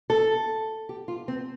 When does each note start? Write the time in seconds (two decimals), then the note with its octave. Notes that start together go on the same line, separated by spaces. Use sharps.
0.10 A4
0.89 G4
1.08 F4
1.28 C4